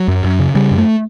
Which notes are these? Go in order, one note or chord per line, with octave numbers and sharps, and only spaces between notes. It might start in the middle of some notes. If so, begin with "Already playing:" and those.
Already playing: F#3
F#2
F#2
C#3
C#3 G3
F#2
A3